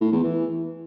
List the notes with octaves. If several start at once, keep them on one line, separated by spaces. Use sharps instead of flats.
A2
E2
E3